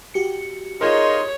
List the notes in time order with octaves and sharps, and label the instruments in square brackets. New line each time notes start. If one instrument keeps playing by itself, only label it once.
[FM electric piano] F#4 G4 C#7
[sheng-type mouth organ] D#4 D#5 C6 [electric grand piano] F4 G#4 A#4 [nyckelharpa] C#5